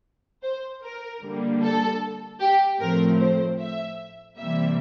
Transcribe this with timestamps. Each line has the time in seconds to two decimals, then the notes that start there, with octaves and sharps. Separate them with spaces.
0.43 C5
0.83 A#4
1.22 D3 G3 A#3
1.62 A4
2.40 G4
2.80 A2 F3 A3 C4 A#4
3.19 C5
3.59 E5
4.38 C3 E3 G3 A#3 E5